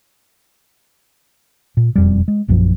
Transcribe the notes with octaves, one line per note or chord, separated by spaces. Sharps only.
A#2
E1 F2 G3
G#3
A#1 F#2 A#2 F3